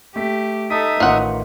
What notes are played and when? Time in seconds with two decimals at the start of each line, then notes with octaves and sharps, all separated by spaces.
0.16 A3 G4 B6
0.70 D#4 A4 E5 D#6 B6
1.00 A1 A2 D#3 F4 F#5